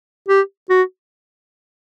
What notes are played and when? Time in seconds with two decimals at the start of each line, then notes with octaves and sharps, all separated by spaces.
0.28 G4
0.70 F#4